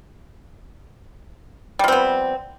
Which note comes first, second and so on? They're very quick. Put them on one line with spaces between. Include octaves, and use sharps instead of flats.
G3 F3 C4 B3